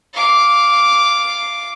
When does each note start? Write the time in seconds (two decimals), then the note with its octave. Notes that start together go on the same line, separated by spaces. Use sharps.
0.14 F5 D6